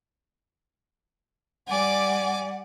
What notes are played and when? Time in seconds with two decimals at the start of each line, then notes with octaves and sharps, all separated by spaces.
1.68 G3 D5 F#5 G#5 D6